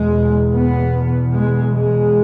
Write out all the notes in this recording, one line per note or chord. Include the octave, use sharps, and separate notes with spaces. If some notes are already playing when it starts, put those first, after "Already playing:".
Already playing: E2 B2 G#3
B3
G#3
G#3